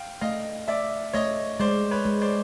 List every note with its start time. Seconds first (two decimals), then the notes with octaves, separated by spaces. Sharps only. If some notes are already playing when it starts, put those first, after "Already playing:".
Already playing: F5 G5
0.21 A3 D#5 F5
0.68 A3 D5 E5
1.13 A3 C#5 D#5
1.59 G#3 C5 D5
1.91 B4 C#5
2.05 G#3
2.21 C5 D5